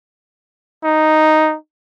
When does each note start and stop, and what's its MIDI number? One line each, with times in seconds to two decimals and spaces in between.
0.84 1.56 63